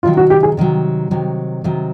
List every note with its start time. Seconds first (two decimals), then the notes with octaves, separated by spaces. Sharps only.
0.03 C3 D#3 F#3 F4
0.17 F#4
0.30 G4
0.43 G#4
0.57 C3 D#3 F#3
1.11 C3 D#3 F#3
1.64 C3 D#3 F#3